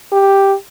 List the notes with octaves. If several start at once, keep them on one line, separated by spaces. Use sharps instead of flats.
G4